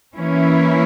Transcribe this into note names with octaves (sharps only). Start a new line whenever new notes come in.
E3 A#3 C#4 E4